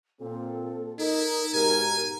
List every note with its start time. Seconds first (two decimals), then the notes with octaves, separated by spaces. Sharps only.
0.20 A#2 C4 A4
0.99 D#4 E4 A#4
1.53 G#2 B2 G4 A#4 G#5